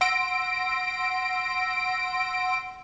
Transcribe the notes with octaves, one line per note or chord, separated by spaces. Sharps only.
F#5 C6 E6 A#6 D7